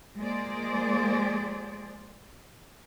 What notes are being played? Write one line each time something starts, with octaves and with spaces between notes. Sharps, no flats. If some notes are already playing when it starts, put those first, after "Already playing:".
F3 G#3 A#3 G#4 C5 D5